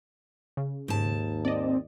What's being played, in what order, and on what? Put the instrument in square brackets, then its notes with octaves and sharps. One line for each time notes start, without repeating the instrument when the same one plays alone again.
[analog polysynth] C#3
[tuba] D#2 [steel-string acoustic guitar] G#2 A5
[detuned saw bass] C4 [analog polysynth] D5 D#5